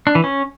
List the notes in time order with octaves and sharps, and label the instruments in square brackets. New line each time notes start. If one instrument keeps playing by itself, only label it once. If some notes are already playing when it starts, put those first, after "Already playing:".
[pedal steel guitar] D4
E3
C#4